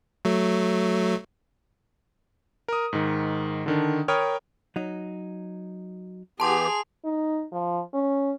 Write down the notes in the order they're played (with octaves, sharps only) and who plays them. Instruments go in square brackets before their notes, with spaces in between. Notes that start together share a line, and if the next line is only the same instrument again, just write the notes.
[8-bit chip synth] F#3 A3
[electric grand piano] A#4 D#6
G#2 D#3
D3 D#3 D4
A#4 C#5 G5 B5 D#6 F6
[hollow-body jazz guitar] F#3 D#4
[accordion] E3 B3 G4 [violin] G#4 F7 [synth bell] A5 C6
[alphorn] D#4
F3
C#4